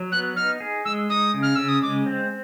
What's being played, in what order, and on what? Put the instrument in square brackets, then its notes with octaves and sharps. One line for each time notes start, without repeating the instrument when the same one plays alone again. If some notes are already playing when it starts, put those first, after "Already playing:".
Already playing: [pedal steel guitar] F#3
[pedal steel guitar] B3 [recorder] F#6
[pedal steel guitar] D#4 [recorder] F6
[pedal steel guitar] G#4
[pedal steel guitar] G#3 [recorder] E6
[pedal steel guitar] D#4 [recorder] D#6
[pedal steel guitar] C#3
[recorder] F6
[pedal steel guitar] C#3 [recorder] E6
[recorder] D#6
[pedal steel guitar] G#3 [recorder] D6
[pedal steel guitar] C4